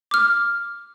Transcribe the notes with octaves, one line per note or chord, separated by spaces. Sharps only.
D6 F6